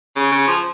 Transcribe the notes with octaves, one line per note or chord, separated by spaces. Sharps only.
C#3
C#3
F3